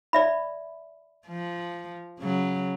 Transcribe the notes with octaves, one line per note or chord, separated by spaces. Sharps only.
D5 E5 B5
F3
C#3 F#3